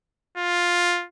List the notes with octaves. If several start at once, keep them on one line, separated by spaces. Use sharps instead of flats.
F4